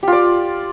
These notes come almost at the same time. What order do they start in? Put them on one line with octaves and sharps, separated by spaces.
G4 F4 D5